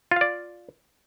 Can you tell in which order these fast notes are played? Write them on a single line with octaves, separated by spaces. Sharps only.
F4 F5 D5